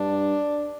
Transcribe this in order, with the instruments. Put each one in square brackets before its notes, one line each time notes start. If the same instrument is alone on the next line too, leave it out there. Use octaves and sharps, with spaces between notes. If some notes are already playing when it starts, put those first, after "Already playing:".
Already playing: [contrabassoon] G2 [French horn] D4